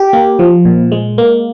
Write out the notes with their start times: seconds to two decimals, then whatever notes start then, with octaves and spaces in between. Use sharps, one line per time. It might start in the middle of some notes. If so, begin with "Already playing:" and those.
Already playing: G4
0.13 A#3
0.39 F3
0.65 A#2
0.92 G#3
1.18 A#3